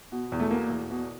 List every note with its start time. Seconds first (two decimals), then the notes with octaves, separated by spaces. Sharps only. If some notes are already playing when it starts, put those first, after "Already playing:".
0.12 B2
0.32 E2
0.40 A3
0.51 B2 A#3
0.70 E2
0.91 B2